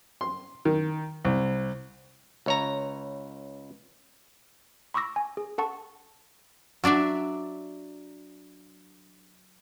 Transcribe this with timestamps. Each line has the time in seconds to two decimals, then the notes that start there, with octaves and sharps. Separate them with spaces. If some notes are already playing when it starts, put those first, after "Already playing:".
0.21 C6
0.65 D#3
1.25 C2
2.46 C#2 C#5 A#5
4.94 B5 C#6 D6 E6 A#6
5.16 G#5
5.37 G#4
5.58 A4 F#5 A5 C#6
6.84 F#3 D4 D5 E5